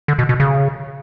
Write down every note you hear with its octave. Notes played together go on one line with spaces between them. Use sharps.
D3
B2
B2
C#3